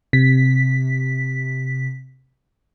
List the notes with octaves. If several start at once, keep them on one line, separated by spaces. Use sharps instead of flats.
C3 B6